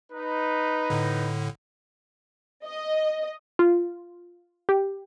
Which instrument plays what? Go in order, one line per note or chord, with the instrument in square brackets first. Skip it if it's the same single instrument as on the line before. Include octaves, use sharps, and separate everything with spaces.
[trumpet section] D#4 B4
[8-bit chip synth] A2 D3
[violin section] D#5
[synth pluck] F4
G4